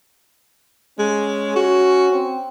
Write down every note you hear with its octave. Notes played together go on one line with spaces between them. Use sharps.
G#3 C#4
F#4
C4